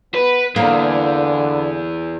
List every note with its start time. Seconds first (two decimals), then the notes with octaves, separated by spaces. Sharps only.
0.15 B3 B4
0.56 E2 D3 A#3